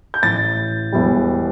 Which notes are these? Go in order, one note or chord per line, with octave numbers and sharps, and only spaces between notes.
G6
A1 A2 E3 A6
E1 E2 E3 G3